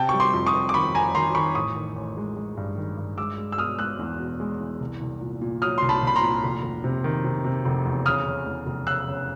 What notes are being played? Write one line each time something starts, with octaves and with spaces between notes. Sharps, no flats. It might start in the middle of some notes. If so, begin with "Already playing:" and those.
Already playing: C3 G5 A5
G3 C#6
C6 D6
F2
C#6 D#6
F2
D6
D#3 B5 C#6
F2 G#5 A#5
D#3 A#5 C6
D#3 B5 C#6
A1 C#6 D#6
D#3
A1
G#3
G#3
G2
D#3
G2
G#3 D6 E6
G#3
E6
B2 D#6 F6
G#3 E6 F#6
E2
B2
G#3
E2
C2
C2
A#2
A#2
F#3 D#6 F6
C2 C6
A5 B5
C2 B5
A#5 C6
A#2
F1
F1
C3
D#3
C3
C3
F1
E2
C#3 D#6 F6
C#3
E2
F1
C#3 E6 F#6
C#3